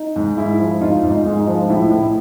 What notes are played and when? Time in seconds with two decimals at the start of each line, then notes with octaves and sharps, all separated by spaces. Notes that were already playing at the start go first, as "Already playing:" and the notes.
Already playing: D#4
0.16 G#2
0.37 G#3 E4
0.59 F3
0.81 G#2 D#4 F4
1.03 G#2
1.10 D#4
1.25 G#3
1.40 D#4
1.47 F3
1.69 A2 E4
1.91 A2